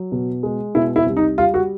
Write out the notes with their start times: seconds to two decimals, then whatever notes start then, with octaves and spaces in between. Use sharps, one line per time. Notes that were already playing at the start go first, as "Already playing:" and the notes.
Already playing: F#3
0.12 B2
0.43 G#3
0.75 B2 E4
0.96 E4
1.07 C2
1.17 D#4
1.38 G3 F4
1.54 F#4